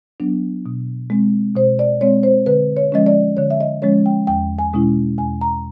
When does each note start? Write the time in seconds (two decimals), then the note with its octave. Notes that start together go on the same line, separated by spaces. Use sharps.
0.20 F#3 B3 D4
0.66 B2
1.10 G#3 C4
1.55 B2 C5
1.79 D5
2.01 G#3 C4 C#5
2.23 C5
2.46 D3 B4
2.77 C#5
2.92 F3 G#3 C#4 D#5
3.06 D5
3.37 D3 C#5
3.50 E5
3.61 D#5
3.82 F3 G#3 C#4 C#5
4.06 G5
4.27 E2 G5
4.59 G#5
4.73 B2 G#3 C#4 E4
5.18 E2 G#5
5.41 A#5